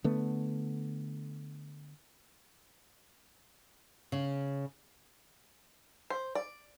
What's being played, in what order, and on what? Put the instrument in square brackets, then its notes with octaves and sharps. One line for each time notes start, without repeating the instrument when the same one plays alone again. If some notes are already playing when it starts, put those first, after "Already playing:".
[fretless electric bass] D3 A3 B3
[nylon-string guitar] C#3
[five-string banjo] C5
D5